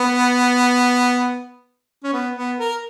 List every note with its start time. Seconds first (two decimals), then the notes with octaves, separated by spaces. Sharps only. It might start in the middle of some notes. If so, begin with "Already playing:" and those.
Already playing: B3
2.03 C#4
2.13 B3
2.36 B3
2.59 A#4